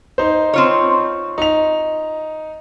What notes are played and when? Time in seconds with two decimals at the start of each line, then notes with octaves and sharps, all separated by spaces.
0.18 D#4 C5
0.54 C4 F4 C#5
1.38 D#4 F7